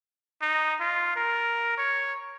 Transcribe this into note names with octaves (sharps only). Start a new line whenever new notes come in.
D#4
F4
A#4
C#5